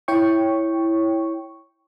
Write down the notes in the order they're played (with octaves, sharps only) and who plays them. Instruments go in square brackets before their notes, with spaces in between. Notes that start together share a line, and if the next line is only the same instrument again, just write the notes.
[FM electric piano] E4 C#5 G5 C#6